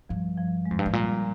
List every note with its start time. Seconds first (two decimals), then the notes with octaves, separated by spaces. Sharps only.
0.09 G2 F3
0.37 F3
0.66 G#3
0.71 F2
0.79 G2
0.86 G#2
0.93 A#2 G3